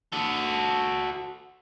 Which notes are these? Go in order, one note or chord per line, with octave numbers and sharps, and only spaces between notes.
F#4 A4